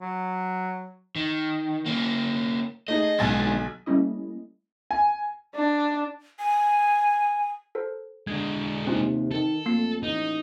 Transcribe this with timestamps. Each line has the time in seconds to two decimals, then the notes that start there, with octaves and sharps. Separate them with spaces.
0.02 F#3
1.16 D#3
1.86 A#3 C#4
2.88 A3 D#4 G#4 D#5
3.19 B1 D3 G#3 G#5 A6
3.86 G3 A3 A#3 C#4 E4 D#5
4.91 G#5
5.55 D4
6.40 G#5
7.75 A4 A#4 C5
8.27 D3 G#3 D4 G#6
8.87 D#2 C3 C4 C#4 F4
9.32 D#3 A4
9.66 F2 A3 A#3 C7
10.03 A1 D#4